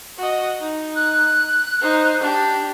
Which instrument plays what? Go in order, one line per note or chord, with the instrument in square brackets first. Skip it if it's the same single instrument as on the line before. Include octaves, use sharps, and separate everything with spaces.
[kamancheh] F#4 D#5
D#4
[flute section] F#6
[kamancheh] D#4 C5
D4 G4